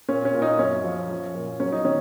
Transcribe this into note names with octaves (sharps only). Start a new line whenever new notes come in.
A#2 C#4
C#4
A#2
D#4
F#2 C#4
F3
F3
A#2
F#3 C#4
D#4
D#3 C#4